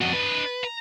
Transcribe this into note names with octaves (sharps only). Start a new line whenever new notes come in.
F2 D4 F#4 D#5
B4
A#5